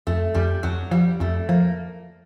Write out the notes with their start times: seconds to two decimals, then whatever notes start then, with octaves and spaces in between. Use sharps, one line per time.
0.07 F2 A3
0.34 F2 G3
0.63 F2 F#3
0.91 F3 G3
1.20 F2 A3
1.49 F3 A#3